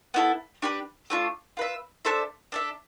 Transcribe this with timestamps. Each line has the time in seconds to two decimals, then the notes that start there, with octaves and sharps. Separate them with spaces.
0.14 B3 E4 A4
0.62 D4 G4 B4
1.10 A3 D4 F4
1.57 F4 B4 E5
2.05 D4 A4 C5 E5
2.52 D4 A4 E5